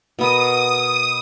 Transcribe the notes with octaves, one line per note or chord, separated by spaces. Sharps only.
B2 B3 A#4 D#6